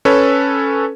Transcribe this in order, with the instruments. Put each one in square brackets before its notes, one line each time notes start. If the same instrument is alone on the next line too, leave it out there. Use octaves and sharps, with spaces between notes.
[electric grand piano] C#4 A4 B4 C#5